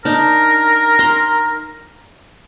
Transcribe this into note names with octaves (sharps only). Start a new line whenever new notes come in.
D4 D#4 A#4
A#5 C6